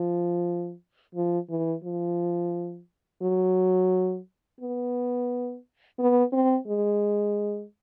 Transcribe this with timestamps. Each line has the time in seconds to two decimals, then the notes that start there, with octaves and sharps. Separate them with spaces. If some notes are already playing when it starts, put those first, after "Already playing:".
Already playing: F3
1.15 F3
1.50 E3
1.84 F3
3.22 F#3
4.61 B3
5.99 B3
6.32 C4
6.67 G#3